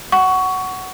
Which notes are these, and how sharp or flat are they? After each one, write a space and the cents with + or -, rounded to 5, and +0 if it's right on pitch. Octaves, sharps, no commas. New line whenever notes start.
F#5 +10 C#6 +15